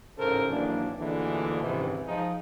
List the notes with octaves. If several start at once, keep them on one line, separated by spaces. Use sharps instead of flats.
A1 G#2 C#3 A4 A#4 C5
G#1 E3 F#3 A#3 D4
D2 A#2 D3 E3 G#3 D4
C#2 G#2 C3 D#3 E3
F3 G#3 D#4